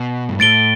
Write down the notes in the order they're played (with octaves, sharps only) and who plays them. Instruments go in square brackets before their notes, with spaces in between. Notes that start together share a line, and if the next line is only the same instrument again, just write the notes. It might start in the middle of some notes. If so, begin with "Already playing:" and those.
Already playing: [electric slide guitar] B2
G2
[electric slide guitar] A2 [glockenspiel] A6 D7 G7